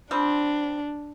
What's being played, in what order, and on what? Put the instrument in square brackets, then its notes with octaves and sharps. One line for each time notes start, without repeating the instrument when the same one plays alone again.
[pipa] F3 G3 C4 [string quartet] D4